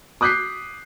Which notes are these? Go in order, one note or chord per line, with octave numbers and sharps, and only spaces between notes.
D6 D#6 F#6 G6 B6 C7